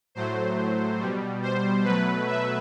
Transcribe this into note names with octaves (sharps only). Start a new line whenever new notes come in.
A2 F#3 A3 C5
B2 G3
C5
B2 F#3 A3 B4
E5